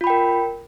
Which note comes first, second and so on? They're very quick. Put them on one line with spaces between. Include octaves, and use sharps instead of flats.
F4 B5 G5 A#4